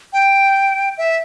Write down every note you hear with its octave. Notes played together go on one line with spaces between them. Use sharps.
G5
E5